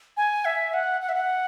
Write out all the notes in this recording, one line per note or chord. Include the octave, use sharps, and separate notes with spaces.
G#5
E5
F#5
F#5
E5
F#5